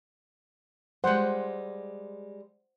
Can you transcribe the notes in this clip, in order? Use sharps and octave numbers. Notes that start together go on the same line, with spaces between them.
G3 G#3 C5 F#5